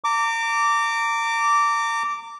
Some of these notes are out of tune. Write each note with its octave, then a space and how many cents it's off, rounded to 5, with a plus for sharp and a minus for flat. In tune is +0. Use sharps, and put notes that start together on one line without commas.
A#5 -35 D6 -10